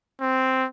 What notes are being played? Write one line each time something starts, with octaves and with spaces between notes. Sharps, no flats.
C4